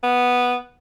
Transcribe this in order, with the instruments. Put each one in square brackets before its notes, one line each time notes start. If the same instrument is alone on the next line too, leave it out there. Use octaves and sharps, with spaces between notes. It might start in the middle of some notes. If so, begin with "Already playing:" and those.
[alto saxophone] B3